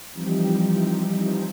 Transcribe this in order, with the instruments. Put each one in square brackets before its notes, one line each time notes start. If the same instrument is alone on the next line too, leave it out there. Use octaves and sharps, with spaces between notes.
[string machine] E3 F3 G3 C4 D#4 G4